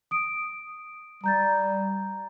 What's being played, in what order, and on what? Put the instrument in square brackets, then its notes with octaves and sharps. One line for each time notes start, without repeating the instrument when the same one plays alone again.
[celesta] D#6 D7
[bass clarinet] G3 [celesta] A#5 G6 A6